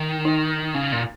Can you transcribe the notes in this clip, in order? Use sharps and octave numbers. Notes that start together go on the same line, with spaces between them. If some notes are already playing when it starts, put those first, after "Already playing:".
Already playing: D#3
D#4
C#3
A#2